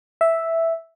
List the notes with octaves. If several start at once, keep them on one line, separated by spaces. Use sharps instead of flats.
E5